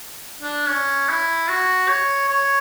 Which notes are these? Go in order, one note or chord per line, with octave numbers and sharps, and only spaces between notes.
D4
C#4
E4
F#4
C#5
C#5